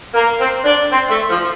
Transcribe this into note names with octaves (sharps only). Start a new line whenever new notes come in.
A#3
C4
D4
C4
A3
F3